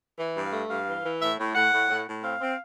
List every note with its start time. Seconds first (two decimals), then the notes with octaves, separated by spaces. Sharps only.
0.19 E3
0.36 G2
0.45 F5
0.53 A3
0.69 G2 F5
0.87 E3
1.04 E3
1.21 A2 E5
1.39 A2
1.55 A2 F#5
1.72 A2
1.90 A2
2.07 A2
2.23 C4 F5
2.40 C4